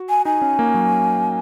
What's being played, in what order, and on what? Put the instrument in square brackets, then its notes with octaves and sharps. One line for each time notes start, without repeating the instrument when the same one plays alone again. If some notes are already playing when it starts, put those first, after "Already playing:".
Already playing: [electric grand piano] F#4
[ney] G#5
[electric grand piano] D#4 [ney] G#5
[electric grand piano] C#4
A#3
F#3